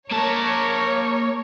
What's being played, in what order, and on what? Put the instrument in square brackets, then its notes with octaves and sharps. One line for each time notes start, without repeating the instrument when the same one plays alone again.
[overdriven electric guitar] A#3 A5 [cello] A#4 [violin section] C#5